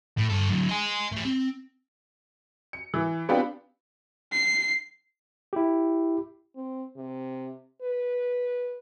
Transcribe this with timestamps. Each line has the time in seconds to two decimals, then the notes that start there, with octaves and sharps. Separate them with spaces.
0.18 A2
0.29 G2 A4
0.49 D3 F#3
0.69 D#5 G#5
1.12 A3 G4
1.25 C4
2.73 C#7
2.94 E3
3.29 B3 C4 D4 F4 G4 B4
4.32 C7
5.53 E4 G4
6.56 C4
6.97 C3
7.82 B4